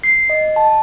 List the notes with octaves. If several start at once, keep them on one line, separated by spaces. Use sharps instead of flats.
C7
D#5
A5